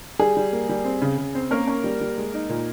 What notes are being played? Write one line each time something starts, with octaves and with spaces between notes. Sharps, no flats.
G3 G#4
G3
A#3
G3
C4
C#3
C#3
C4
A#3 C#4 A#4
C#4
G3
G3
G#3
D#4
A#2